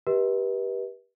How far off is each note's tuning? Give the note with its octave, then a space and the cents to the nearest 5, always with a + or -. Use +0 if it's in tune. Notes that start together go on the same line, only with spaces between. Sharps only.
G4 +0 B4 -35 D#5 +40